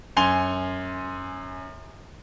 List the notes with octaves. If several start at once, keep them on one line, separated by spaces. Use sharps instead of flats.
F#2 G#5 C6 F7 G7